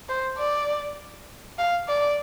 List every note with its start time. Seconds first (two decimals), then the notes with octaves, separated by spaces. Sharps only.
0.09 C5
0.38 D5
1.58 F5
1.88 D5